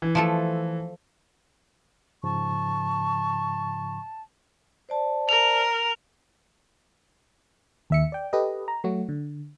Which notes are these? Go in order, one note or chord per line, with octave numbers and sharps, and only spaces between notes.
E3
F3 A3 A4
G#2 C#3 F3 A5 C#6
C5 D5 A5
A#4 F7
D#2 E5 C#7
D5 G5
G4 A4 B4 D#5
A#5
F#3 A3 F#4
D3